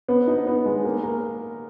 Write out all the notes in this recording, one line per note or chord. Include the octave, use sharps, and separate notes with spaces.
B3
D#4
B3
G#3
A#3
A#4